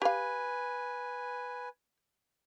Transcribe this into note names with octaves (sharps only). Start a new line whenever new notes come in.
G4 B4 F5 G#5